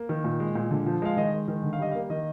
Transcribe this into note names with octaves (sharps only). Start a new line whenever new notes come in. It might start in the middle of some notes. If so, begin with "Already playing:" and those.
Already playing: A#3
D#3
A#2
G#3
A#2
D3
F3
G#3 F5
D#3 D#5
G#3
D#3
D3
F5
G3 D#5
F5
A#3
D#3 D#5